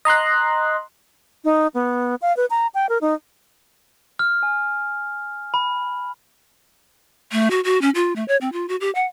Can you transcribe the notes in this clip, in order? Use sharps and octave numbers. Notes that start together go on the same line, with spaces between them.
D#5 A#5 C6 F#6
D#4
B3
F5
B4
A#5
G5
A#4
D#4
F6
G#5
B5
A3
F#4
F#4
C#4
F4
A3
C#5
C4
F4
F#4
G4
F#5